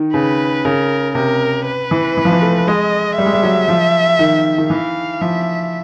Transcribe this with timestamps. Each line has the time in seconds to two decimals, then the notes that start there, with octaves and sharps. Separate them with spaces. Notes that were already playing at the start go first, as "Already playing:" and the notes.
Already playing: D#3
0.14 C#3 B4
0.65 C#3 A#4
1.15 C3 A#4
1.66 B4
1.91 E3
2.17 E3
2.25 F3
2.32 E3
2.42 A3
2.68 G#3 D#5
3.18 G3 E5
3.26 G#3
3.33 G3
3.43 F#3
3.68 F3
4.19 D#3
4.58 D#3
4.70 E3 F5
5.21 F3 E5